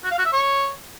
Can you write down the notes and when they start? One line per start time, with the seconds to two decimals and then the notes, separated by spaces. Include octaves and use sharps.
0.04 F#4
0.11 F5
0.18 F#4
0.26 E5
0.33 C#5